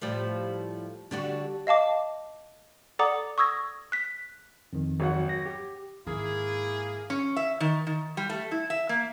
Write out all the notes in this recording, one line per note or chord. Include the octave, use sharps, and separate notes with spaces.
A2 F3 G3
D3 G3 F#4
D#5 F5 A5 D6
A4 D5 F#5 A#5 D6 D#6
C#6 D#6 E6 G#6 A#6
F#6 B6
F2 D#3
G#1 F#3 F#5
A#6
G4
G#2 D#3 A#3 E4 G#4
C#4
E5
D#3
D#3
G3
A3
E4
E5
A#3